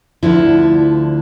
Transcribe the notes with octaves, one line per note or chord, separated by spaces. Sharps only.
D2 D3 F3 E4